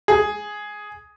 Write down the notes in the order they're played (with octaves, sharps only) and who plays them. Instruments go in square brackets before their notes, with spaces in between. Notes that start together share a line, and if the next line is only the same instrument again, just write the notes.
[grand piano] G#4